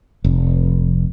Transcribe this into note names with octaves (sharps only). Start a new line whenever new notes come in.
F1